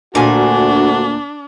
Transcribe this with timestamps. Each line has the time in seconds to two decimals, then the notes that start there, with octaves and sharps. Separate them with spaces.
0.15 D2 A#2 D4 F#4 G#5